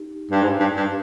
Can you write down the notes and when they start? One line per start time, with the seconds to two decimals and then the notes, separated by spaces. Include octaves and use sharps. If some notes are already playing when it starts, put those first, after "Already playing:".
Already playing: D#4 G4
0.31 G2
0.42 G#2
0.59 G2
0.76 G2